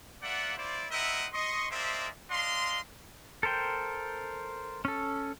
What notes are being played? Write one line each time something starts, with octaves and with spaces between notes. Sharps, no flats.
A#3 F4 D5 E5 F#5
E4 F4 C5 D5
C4 E4 A#4 D#5 E5 F#5
D#5 C6 C#6
G#3 A#3 C5 D5 E5
D4 D#5 F5 C6
A4 A#4 C5 G5
C#4 A4